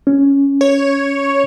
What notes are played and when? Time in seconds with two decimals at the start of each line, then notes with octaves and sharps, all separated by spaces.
0.07 C#4
0.61 C#5